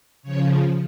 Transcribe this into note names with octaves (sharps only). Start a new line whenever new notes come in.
C#3 F3 C#5